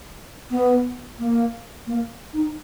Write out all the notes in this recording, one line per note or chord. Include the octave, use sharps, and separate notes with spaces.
B3
A#3
A#3
D#4